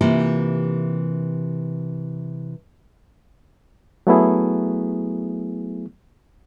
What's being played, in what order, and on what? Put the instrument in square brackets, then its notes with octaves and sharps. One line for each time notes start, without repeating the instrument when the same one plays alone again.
[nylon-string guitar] C3 E3 A#3 F4 G4
[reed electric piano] F#3 A3 B3 E4 G#4